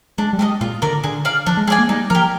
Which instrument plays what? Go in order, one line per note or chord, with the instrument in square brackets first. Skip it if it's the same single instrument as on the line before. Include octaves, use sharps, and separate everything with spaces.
[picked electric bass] G#3 [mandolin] D4
[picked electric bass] G3
[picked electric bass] G#3 [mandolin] G4 A#4 D#5
[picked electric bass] A#2 [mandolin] F4
[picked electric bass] D3 [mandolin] A#4 D5
[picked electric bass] D3 [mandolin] G#4
[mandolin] D5 F5
[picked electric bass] F3 [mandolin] D4
[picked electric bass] G#3
[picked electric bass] G#3 [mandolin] G#4 D5 G#5
[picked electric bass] A#3
[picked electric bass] G3 [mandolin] D#4
[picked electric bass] F3 [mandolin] A#4
[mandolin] G4